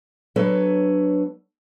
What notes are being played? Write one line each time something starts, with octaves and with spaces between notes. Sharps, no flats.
F#3 B3 D4 A4 B4 C#5